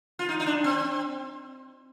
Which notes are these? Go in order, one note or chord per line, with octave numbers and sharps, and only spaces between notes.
F4
D#4
D#4
D4
C4